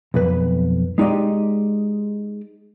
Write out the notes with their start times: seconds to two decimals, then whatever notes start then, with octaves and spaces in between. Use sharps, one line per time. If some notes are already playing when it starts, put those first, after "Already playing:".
0.14 B1 F2 B4
0.98 G#3 D#4 G4 D5 D#5